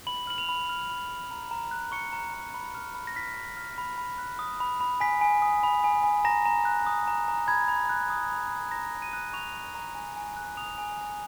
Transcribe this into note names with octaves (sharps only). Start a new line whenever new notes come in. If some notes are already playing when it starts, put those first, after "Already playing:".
B5 F#7
F6 F#7
F7
B5
F6
B5
F6
A#5
A#5
F#6
C#6 C#7
A#5
A#5
B5
F6
B5
A#6
F6 B6
B5
F6
B5
B5
F#6
D#6
B5
B5
G#5 B6
G#5
D#6
B5
G#5
G#5
A#5 A#6
A#5
F#6
D#6
A#5
A#5
B5 G#6
B5
F#6
D#6
B5
B5
A#5 A#6
A#5
D#7
F#6
C#6 F7
A#5
A#5
G#5
G#5
F#6
D#6 F7
G#5
G#5